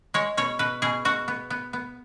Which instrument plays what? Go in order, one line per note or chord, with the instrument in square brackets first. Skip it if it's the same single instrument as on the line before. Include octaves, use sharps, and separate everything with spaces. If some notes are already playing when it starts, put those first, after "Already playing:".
[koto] G#3 C#5
B2 C#5
B2 B4
B2 G#4
B2 F#4
B3
B3
B3